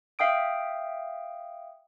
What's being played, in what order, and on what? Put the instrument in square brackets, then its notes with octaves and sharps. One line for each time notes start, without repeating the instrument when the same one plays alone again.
[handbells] E5 F5 G5 D#6 D7